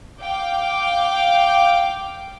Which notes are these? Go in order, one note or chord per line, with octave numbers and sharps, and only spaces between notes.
F5 G5 D6